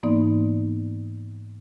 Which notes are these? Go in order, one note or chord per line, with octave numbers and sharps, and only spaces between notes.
G#2 E3 A#3 B3 D#4 D5